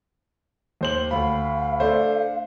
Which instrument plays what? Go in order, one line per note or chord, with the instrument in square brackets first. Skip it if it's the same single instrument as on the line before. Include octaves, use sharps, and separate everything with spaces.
[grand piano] D#2 C5 F#7
[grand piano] D2 B5 [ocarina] F5
[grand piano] A3 D4 C5